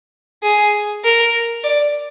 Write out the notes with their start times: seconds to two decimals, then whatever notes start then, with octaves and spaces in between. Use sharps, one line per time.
0.43 G#4
1.04 A#4
1.63 D5